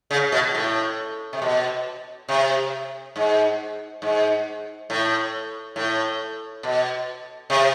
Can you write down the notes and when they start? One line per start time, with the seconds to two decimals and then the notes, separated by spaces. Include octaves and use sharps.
0.11 C#3
0.32 B2
0.54 A2
1.33 C3
1.42 B2
2.28 C3
3.16 G#2
4.02 G#2
4.90 A2
5.76 A2
6.63 B2
7.50 C3